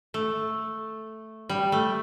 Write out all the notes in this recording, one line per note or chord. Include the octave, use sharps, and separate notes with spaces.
A3
G3
A3